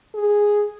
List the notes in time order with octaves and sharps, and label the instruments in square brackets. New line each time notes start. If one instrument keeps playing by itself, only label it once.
[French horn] G#4